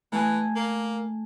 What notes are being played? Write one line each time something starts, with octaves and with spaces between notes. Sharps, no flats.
E3 A3 G#5
A#3